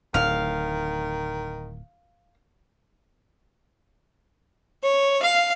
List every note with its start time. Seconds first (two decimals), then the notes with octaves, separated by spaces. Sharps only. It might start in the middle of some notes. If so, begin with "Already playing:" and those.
0.14 D1 A2 D#3 F5
4.83 C#5
5.23 F5